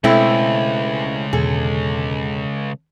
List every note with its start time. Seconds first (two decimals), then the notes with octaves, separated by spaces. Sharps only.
0.04 C#2 B2 G#3 A3 C4 E4
1.33 E2 B2 D3 G#4 A4